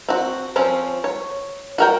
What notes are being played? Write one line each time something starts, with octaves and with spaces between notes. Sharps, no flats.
C4 F#4
F3 C4 C#4
C#5
F#4 A#4 G5